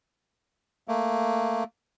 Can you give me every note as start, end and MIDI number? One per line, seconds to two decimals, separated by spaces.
0.88 1.64 57
0.88 1.64 58